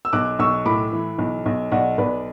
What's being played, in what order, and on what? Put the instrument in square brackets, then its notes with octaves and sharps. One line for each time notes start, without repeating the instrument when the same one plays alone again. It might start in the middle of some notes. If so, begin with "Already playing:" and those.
[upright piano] E6
B1 D6 F#6
B1 C#6 E6
A2 B5 D6
E3
B1
B1
B1 D5 F#5
B1 B4 D5